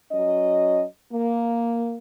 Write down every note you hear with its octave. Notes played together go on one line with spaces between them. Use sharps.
F#3 C#4 D#5
A#3